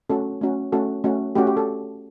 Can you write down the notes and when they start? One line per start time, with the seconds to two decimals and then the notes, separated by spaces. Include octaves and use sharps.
0.09 A3 C#4 F#4 A4
0.41 A3 C#4 F#4
0.72 A3 C#4 F#4 A4
1.04 A3 C#4 F#4
1.35 A3 C#4 F#4 G4
1.47 G4
1.57 A4